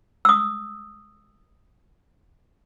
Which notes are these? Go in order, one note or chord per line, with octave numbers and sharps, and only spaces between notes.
D#6 E6